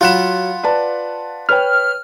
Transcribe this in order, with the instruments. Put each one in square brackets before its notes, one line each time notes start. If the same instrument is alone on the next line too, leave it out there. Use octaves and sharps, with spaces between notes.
[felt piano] F#3 E7 [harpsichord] F4 F#5 B5
[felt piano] B4 D5 A5
[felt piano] B4 C#5 G5 [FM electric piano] F6